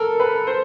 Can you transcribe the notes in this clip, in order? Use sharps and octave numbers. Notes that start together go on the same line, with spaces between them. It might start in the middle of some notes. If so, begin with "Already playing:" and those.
Already playing: A4 A#4
B4
C5